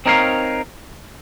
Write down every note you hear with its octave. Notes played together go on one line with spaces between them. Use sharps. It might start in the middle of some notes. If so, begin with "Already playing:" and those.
C4 D#4 A#4 C#5 F5